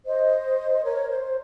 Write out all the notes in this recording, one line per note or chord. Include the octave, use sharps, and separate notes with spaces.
C5 D#5
A#4 C#5
C5